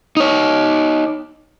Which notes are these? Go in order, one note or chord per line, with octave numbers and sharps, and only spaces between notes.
D#4 C#5